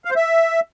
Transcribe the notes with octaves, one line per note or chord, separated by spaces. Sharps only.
F5
C5
E5